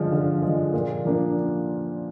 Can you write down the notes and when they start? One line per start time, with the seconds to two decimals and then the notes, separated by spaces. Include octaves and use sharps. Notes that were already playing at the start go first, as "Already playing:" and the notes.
Already playing: D3 F3 G#3
0.12 D3
0.43 F3 G#3
0.73 A#2
1.05 F3 A#3 D4